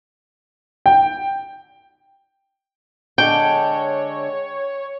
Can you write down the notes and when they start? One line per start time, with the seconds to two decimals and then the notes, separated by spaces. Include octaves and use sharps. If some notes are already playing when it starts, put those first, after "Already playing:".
0.86 G5
3.18 D3 G#3 D4 C#5 G5